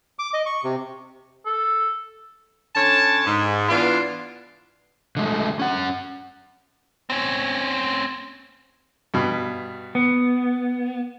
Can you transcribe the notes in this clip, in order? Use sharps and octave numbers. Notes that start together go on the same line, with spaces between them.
D6
D#5
C#6
C3
A4
D3 C#4 C#5 A5
G#2
E3 B3 D4 F4
D3 G#3 A3
C#4 F#5
C4 C#4
G2 B2
B3